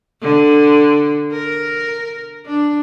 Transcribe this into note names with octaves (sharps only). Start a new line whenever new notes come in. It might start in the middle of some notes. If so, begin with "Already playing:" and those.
D3
A#4
D4